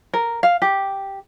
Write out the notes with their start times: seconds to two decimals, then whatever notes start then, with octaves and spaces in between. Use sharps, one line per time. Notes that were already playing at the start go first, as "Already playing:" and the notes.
0.13 A#4
0.43 F5
0.62 G4